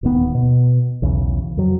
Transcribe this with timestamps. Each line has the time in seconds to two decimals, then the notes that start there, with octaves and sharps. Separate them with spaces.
0.03 D1 D#2 D#3 B3
0.35 B2
1.02 B1 E2 C#3
1.57 F2 F#3